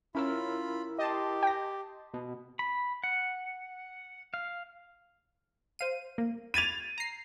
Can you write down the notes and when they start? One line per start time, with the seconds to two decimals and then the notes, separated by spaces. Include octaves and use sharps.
0.15 C#4 E4 F4 A#4 B5 E6
0.99 G4 D#5 A5 C6
1.43 G5 A#6
2.14 B2
2.59 B5
3.04 F#5
4.34 F5
5.79 C5 F5 D#7
6.18 A#3
6.54 B5 G#6 A6 D#7 F7
6.98 A#5 C7